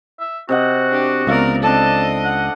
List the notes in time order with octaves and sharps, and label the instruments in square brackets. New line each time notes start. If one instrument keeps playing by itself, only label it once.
[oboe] E5
[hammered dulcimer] C3 D#5 F#5 [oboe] F#4
[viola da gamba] D4 G4
[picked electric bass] C#2 [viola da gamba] B3 A#4 [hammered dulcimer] D5 E5 F5
[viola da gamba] C4 D#5 [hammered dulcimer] D4 A4 [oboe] A5
[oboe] F#5